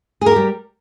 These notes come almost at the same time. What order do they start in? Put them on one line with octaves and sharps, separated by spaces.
G#4 A#4 G4 G3